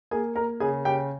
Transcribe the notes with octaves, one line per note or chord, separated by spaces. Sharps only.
A#3 G#4 G#5
A#3 A#4 A#5
C#3 G#4 G#5
C#3 G4 G5